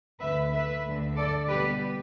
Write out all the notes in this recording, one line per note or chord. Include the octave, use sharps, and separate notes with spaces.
D2 D3 A3 B4 E5
B4 E5
D2 D3 A3
A4 D5
B2 G3 B3 G4 B4